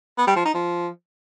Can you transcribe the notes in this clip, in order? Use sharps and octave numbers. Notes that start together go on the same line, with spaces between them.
B3
G3
F3
D#4
F3